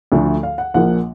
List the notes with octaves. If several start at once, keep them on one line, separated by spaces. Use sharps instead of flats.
D2 D3 F3 A3
F5
F#5
A#1 A#2 F3 A#3 F#5